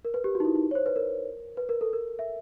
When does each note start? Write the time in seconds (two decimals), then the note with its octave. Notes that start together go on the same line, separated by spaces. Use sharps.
0.05 A#4
0.14 B4
0.24 G4
0.35 F#4
0.40 D#4
0.45 E4
0.55 D#4
0.71 C#5
0.75 C5
0.86 B4
0.96 A#4
1.57 B4
1.69 A#4
1.81 A4
1.93 A#4
2.19 E5